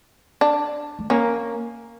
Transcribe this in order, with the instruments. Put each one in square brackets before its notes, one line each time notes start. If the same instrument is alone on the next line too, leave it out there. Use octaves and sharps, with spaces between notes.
[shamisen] D4
[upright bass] A3
[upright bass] A#3 [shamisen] C#4